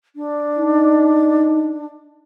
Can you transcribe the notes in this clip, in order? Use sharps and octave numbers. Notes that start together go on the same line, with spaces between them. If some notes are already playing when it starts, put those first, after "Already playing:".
D4
D#4